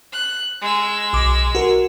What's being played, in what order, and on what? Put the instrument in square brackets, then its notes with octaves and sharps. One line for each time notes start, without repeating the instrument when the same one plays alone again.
[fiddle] F#6
G#3 E6
[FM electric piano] B1 D6
F#4 A#4